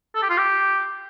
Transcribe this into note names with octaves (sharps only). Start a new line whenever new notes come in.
A4
G4
F4
G4